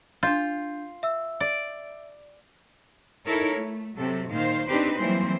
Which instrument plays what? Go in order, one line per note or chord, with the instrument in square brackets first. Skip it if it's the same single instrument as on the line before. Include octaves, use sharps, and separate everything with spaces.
[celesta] D4 G6 [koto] F4
[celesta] E5 E6
[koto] D5
[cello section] D#4 E4 A4 A#4 C#5
A3
C3 F#3 A4
A#2 D#3 C5 F5
C4 D4 D#4 G4 B4 C5
E3 F#3 G3 A#3 C4 C5